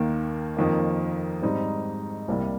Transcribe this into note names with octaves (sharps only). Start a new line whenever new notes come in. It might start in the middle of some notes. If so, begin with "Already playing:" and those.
Already playing: D#2 D#3 A#3
F2 D#3 A#3
G#2 G3 C4 D#4
C2 C3 G3 A#3